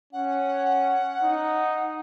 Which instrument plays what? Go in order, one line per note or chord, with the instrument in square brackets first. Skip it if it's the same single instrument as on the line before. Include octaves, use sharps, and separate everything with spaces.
[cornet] C#4 [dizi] F#5
[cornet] D#4